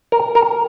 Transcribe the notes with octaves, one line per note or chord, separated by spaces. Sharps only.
A#4
A#4